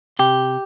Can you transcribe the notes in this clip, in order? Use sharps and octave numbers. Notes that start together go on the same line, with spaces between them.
C3 G4